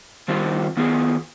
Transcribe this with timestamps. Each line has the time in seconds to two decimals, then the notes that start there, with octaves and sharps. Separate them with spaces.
0.28 D#3 G3 C4 F4
0.77 D#3 B3 F4 G#4